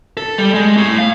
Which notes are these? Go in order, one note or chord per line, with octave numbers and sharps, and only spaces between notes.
A4
G3
G#3
A2
F5